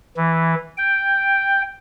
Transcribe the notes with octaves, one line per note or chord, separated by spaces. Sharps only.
E3
G5